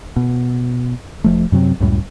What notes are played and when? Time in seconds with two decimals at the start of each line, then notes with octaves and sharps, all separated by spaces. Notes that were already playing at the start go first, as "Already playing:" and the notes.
0.16 B2
1.24 E1 F3 A3
1.52 F#2 C3 F#3 C4
1.80 C#2 F#2 A2 G3